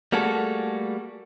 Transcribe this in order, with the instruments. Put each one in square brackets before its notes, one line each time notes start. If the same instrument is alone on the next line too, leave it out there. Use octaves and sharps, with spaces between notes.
[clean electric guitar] G3 A3 A#3 F#4 G#4 A4